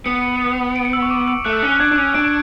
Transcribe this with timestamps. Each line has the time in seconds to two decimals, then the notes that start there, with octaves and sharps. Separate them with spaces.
0.06 B3 C#7
0.23 C#7
0.41 C#7
0.76 D7
0.85 C#7
0.93 E6
1.02 C#6
1.10 D6
1.28 E6
1.45 A3 F#6
1.53 E6
1.61 C#4 F#6
1.72 F#6
1.80 D4 G#6
1.91 D4
1.98 C#4
2.15 D4 D7